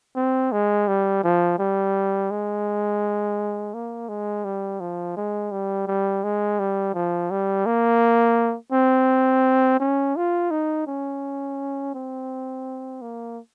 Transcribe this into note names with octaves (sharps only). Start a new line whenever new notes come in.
C4
G#3
G3
F3
G3
G#3
A#3
G#3
G3
F3
G#3
G3
G3
G#3
G3
F3
G3
A#3
C4
C#4
F4
D#4
C#4
C4
A#3